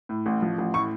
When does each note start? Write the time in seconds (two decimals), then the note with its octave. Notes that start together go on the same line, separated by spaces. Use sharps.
0.09 A2
0.26 A1
0.42 F3
0.58 A1
0.74 A2 C#6